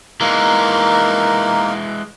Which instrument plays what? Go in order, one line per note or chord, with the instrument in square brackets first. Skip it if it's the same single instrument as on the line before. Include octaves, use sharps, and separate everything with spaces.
[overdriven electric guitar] E3 G#3 [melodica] A#3 D#4 A#4